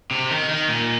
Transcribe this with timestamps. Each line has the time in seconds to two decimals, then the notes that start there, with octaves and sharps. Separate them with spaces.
0.11 C3
0.30 D#3
0.49 D#3
0.69 A#2